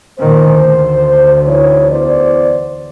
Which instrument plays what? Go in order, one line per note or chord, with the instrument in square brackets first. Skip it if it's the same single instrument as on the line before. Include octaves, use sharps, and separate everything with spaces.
[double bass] A#2 D#3 [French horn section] C5
[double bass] D2
[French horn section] E3 D#4 C#5
E2 C5 D5